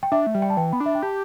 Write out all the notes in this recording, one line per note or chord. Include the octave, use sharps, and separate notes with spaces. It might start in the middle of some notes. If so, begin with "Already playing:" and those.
G5
D4 E5
A3
G3
G5
A5
E3 G5
B3 B5
D4
E5
G5
G4 A5